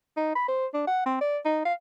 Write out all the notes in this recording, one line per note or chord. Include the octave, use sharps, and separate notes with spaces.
D#4
B5
C5
D4
F#5
C4
D5
D#4
F5